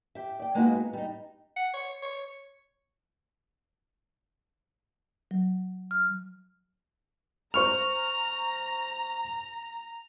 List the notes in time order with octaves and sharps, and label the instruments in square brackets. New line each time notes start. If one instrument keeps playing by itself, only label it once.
[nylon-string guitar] G4 E5
D5 G5
G#3 A#3 B3 D#4 F4 F#4
B3
G3 D#4
[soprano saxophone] F#5
C#5
C#5
[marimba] F#3
F6
[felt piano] C5 C#6 F6 [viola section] A#5 [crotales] F7